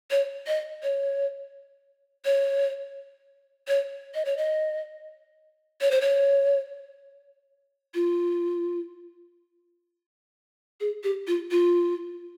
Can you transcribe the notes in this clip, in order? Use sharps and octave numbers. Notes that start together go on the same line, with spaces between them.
C#5
D#5
C#5
C#5
C#5
D#5
C#5
D#5
C#5
C5
C#5
F4
G#4
G4
F4
F4